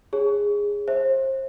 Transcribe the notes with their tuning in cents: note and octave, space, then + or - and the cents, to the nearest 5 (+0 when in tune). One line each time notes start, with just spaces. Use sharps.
G#4 -20 C#5 +0
C5 +30 E5 -10